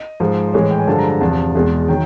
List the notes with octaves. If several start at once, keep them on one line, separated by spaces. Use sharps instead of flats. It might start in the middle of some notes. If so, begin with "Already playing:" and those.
Already playing: D#5
G#2 F3 G#3
C5
A2 E3 G#3 C#5
G5
G#5
G2 D3 F3 G#3 A5
A#5
A#5
E2 C3 F3 A5
E2 B2 G#3
D#3 F#3 G5